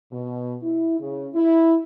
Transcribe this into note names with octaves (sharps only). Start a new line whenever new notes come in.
B2
E4
C#3
E4